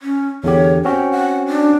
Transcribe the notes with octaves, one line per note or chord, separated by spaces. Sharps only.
C#4
E2 D3 G4 C#5
C4 C#4 F#4 G5
F#5
D4